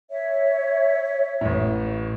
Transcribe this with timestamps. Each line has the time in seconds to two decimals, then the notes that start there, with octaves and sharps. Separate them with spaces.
0.10 C#5 E5
1.41 A1 A2